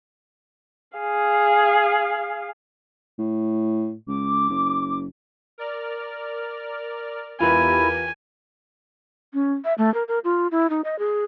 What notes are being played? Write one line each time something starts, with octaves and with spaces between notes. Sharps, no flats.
G#4 F5
A2
C#2 D6
F#1
A#4 D5 F6
E2 E4 F4 G4 A#4 B4 G#5
C#4
E5
A3
A#4
A#4
F4
E4
D#4
D#5
G#4